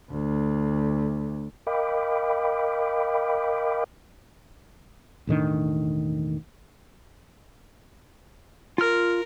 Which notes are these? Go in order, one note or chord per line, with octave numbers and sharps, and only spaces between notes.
D2
A#4 D#5 F5 G5 B5 D6
E1 A2 D#3 D4
F4 A#4 F6